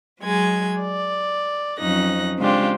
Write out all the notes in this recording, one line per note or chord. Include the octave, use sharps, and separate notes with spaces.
F#3 G#3 G#6
D5
F2 F#3 C#4 D#4 F#6 A#6
C#3 G#3 C4 D4 F4 G4